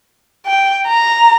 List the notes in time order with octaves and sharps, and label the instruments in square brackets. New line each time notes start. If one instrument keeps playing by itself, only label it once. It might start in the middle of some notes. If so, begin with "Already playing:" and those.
[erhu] G5
A#5